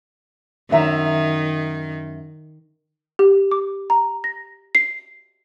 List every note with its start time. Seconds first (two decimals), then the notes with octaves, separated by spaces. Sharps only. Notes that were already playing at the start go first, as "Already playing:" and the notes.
0.71 F#2 D#3 E5 A#5
3.19 G4
3.51 D6
3.90 A#5
4.24 A#6
4.75 C7